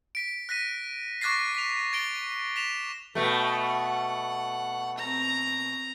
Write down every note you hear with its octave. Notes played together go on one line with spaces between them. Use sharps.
B6 D7
F#6 A#6 B6 D#7
C#6 D6 F#6 A6 A#6 C7
B6 F7
A6 D7 G7
B6 E7 F7
B2 A3 B4 G5
F#5
C4 A#5